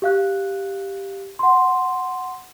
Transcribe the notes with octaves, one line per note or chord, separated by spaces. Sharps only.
G4 F5 F#6
F#5 C6